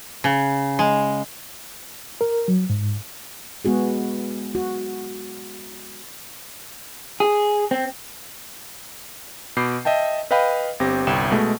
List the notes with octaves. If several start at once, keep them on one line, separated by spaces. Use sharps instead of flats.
C#3
G#3
A#4
F#3
G#2
G#3 B3 F#4 G#4
F#4
G#4
C4
B2 B5 D6 G6 C7
D#5 E5 G5 A5
B4 D#5 F5 G5 B5
G1 C4 G4 A#6
G1 C2 G5 E7
B2 G#3 A3